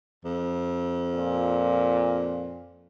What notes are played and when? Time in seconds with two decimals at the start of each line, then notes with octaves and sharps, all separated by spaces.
0.25 F2
1.15 A#2